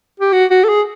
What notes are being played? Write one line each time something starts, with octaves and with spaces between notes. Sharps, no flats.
G4
F#4
F#4
A4
G#4